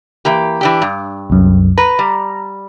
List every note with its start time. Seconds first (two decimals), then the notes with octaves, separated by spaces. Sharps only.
0.25 E3 A#3 G4
0.61 E3 D4 G4
0.82 G2
1.30 C2 F#2
1.78 B4 A#5
1.99 G3